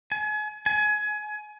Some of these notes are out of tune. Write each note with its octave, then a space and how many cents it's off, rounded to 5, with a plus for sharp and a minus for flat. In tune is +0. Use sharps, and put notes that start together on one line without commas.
G#5 +35
G#5 +25